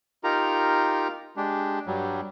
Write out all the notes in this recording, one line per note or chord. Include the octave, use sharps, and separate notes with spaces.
D#4 F4 G4 A#4 A#5
G#3 D4 G4
G2 F#3 G3